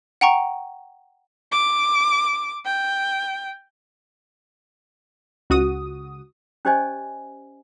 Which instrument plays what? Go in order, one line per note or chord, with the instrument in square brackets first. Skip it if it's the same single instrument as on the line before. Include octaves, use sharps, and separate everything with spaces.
[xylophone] F#5 G5 A#5 C#6
[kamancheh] D6
G5
[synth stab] C#2 F#4 D#6
[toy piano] C#4 G4 C5 D5 D#5 G#5